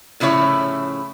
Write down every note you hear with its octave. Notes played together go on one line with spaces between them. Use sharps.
A2 C#3 F3 E4 C#5